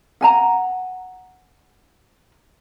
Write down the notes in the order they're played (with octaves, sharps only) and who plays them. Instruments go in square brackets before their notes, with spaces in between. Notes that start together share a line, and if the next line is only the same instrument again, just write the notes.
[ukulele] F#5 G#5 A#5